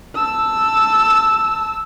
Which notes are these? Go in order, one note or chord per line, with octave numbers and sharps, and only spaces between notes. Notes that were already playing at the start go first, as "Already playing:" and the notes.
A5 E6